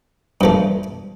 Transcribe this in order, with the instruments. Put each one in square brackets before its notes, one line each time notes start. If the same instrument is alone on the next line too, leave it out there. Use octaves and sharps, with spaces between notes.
[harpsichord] G2 F3 A3